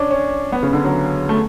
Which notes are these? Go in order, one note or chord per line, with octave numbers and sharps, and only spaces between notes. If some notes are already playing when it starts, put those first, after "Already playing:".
Already playing: C#4 D4
C#4
B3
C#3
D3
F#3
A3